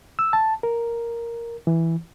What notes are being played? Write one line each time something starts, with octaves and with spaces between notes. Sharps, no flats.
E6
A5
A#4
E3